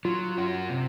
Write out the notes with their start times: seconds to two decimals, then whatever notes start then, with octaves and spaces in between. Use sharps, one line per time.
0.05 F#3 F4
0.37 C#4 F#4
0.69 C3